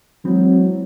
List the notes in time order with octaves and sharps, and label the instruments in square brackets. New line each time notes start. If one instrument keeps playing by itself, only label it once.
[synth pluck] E3 G#3 C4 [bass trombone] F#3